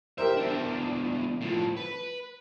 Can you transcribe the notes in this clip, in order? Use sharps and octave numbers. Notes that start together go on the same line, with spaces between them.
G4 A#4 C5 E5
E2 D4
A2 F3
B4